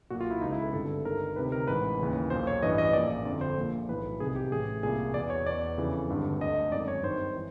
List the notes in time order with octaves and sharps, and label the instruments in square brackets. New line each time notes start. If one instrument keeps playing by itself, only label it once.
[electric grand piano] B1 A#2 F#4
F4
E4
C#2 B2 D#4
E4
A4
G#1 G2 D3 A4
G1 G2 D#3 A#4
D2 C3 D#3 B4
A#4
A1 G#2 E3 B4
D#2 C#3 E3
B1 A#2 C5
C#5
A1 G2 E3 D#5
D#5
A#1 A#2 D5
G1 F2 D3 D5
C5
A#1 A#2
B1 A2 E3 B4
C2 C3 D#3 G#4
G4
A1 A2 E3 G#4
C2 A#2 G#4
E2 B2 D5
C#5
E2 B2 D5
F2 C#3 E3
G#1 G2 D3
D2 D3 D#5
G#1 F#2 D#3 D5
C#5
G#1 G2 D#3 C5
E3